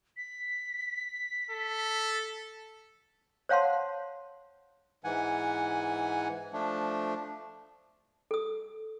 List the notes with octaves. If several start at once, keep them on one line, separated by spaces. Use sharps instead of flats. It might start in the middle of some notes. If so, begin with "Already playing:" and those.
B6
A4
C5 C#5 F5 F#5 A5 C6
G#2 E3 F#5 G#5
F3 A3 D4
A4 D#6